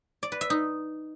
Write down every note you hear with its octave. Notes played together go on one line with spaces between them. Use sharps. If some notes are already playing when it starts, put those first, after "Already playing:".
D5
B4
E5
D#4